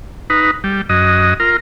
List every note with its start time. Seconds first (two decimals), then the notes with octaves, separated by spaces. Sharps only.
0.30 D#4 B4
0.64 G3
0.89 F#2 D#5
1.40 F4 A#4